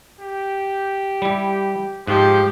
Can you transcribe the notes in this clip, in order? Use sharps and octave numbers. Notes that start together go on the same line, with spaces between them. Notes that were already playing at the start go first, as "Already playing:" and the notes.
G4
G3 E4
G#2 F3 G4